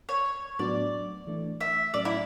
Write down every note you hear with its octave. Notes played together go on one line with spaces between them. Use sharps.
C#5
A2 F#3 B3 D4 F#4 D5
E3 A3 D4
E5
A2 F#3 A3 C#4 D5
E4